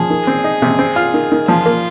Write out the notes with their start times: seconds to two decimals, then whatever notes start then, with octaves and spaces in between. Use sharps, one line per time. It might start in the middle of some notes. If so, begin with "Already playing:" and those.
Already playing: F3 G#4
0.10 D#3
0.27 C4
0.44 D#4
0.62 C3
0.79 C4
0.96 F4
1.14 D#3
1.32 D#3
1.48 F3 F4
1.66 A#3